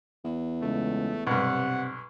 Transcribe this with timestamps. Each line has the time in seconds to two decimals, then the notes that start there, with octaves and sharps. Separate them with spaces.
0.24 E2
0.62 C#2 A3
1.27 B1 G2 C3 F#5